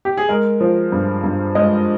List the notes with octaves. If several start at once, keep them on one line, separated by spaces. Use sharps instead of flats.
G4
G#4
G#3 A#4
F3
G2
G2
G#3 D#5